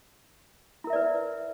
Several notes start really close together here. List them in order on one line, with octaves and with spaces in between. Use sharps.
E4 A#4 E5 D5 B4